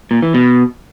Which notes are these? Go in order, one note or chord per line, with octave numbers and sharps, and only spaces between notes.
A#2
E3
B2